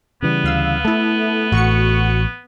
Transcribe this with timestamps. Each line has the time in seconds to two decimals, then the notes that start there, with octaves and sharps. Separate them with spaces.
0.22 C#3 E3 G3 B3
0.44 D2 F5 E6
0.85 A3 E4 A4
1.52 A1 F#4 C#6 C#7